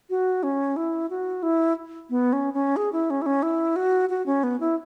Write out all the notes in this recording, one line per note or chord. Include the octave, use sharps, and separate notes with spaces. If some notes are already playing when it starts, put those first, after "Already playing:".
F#4
C#4
E4
F#4
E4
B3
C#4
C#4
G#4
E4
C#4
E4
C#4
E4
F#4
F#4
C#4
B3
E4